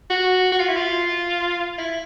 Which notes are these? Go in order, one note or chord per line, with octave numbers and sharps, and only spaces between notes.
F#4
F#4
F4
E4
F4
E4